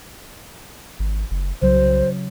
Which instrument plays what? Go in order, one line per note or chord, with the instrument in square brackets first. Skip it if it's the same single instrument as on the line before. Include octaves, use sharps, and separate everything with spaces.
[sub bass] G#1
F#1
[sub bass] C2 [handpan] C#3 F#3 [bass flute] C5